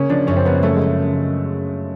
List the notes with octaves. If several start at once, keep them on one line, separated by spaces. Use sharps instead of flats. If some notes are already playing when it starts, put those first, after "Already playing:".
Already playing: C#3 A#3 C#4
F3 D4
F#2 C#4
C4
A#3 B3
F#3 A3
G#3
A3